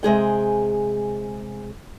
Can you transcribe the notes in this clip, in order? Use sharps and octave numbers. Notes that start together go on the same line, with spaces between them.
C3 G#3 G#4 G5